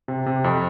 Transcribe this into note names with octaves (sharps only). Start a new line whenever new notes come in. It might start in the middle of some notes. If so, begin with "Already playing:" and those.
C3
C3
F2